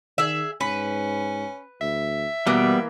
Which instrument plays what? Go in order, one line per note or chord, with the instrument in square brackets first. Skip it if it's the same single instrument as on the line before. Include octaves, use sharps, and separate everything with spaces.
[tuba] D#3 [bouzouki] G#4 E5
[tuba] G#2 [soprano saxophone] C#4 [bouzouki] B4
[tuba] D2 [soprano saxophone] E5
[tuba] B2 [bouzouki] E3 A#3 [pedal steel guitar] G3 B3